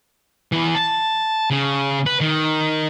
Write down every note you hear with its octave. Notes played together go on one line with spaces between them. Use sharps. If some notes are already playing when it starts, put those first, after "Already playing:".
E3 B3
A5
C#3
B4
D#3